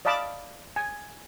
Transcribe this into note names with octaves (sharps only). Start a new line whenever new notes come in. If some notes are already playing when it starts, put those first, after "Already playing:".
D5 D#5 F5 A5 B5 D6
G#5